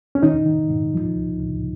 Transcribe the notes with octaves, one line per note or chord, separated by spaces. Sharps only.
C#4
D#3 D#4
D#3
G#2
F3
C#2
C#2